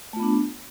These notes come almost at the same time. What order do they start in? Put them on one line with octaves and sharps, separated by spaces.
A3 F4 B3 D4